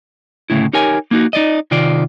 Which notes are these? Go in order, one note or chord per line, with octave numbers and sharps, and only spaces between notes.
D2 A2 C#3 E4
D#4 G4 A#4 C#5 G#5
A#3 D#4 F#4
D#4 D5 D#5
C3 D#3 F4 D5